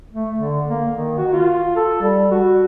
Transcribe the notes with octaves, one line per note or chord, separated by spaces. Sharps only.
A3
D3
A#3
D#3
F#4
F4
A4
G3
F#4